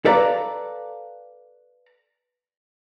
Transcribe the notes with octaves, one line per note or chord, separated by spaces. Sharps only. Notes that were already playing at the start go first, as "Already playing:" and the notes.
A4 B4 D5 F5 A#5